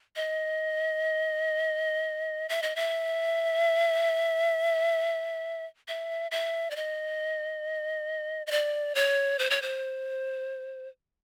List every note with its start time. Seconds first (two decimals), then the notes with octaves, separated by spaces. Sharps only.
0.16 D#5
2.49 E5
2.62 D#5
2.76 E5
5.88 E5
6.31 E5
6.71 D5
6.76 D#5
8.47 D#5
8.51 D5
8.95 C#5
9.39 C5
9.50 C#5
9.62 C5